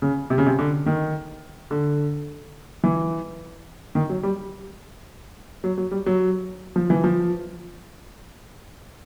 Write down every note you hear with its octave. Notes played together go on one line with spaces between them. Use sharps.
C#3
C3
C#3
C3
D3
D#3
D3
E3
D#3
F#3
G3
F#3
F#3
G3
F#3
F3
E3
F3